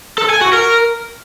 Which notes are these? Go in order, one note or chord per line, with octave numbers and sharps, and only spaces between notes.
A4
G#5
F#4
A#4